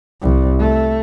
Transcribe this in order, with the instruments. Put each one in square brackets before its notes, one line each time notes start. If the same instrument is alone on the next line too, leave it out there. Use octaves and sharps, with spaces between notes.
[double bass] C2
A3